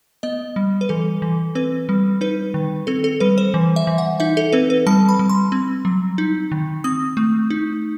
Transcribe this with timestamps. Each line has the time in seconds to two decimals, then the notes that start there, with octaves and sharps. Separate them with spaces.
0.23 B3 D#5
0.56 G3
0.81 B4
0.89 E3 A4
1.22 E3
1.55 C4 B4
1.89 G3
2.21 D#4 B4
2.54 D#3
2.87 C4 A4
3.04 A4
3.20 G3 B4
3.38 C5
3.54 E3
3.76 E5
3.87 E3
3.98 F#5
4.20 D#4 E5
4.37 A4
4.52 C4 B4
4.70 B4
4.87 G3 A5
5.09 B5
5.19 G3
5.29 C6
5.52 C4
5.85 F#3
6.18 D#4
6.52 D#3
6.84 C4 D#6
7.17 A3
7.50 D#4